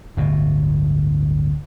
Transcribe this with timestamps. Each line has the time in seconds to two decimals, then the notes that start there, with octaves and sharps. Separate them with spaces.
0.17 D1 G1 B2